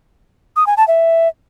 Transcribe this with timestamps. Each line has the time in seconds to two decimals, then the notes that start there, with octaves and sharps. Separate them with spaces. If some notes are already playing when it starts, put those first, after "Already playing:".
0.56 D#6
0.67 G#5
0.77 A5
0.88 E5